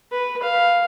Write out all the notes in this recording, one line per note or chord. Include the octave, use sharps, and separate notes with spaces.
B4
F5